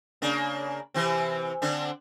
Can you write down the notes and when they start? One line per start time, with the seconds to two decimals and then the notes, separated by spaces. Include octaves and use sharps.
0.22 C#3 A#3 D4
0.94 C3 E3 C4
1.62 D3 C4 D4